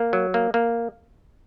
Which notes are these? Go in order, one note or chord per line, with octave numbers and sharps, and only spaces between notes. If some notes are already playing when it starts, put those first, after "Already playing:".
Already playing: A#3
F#3
A#3
A#3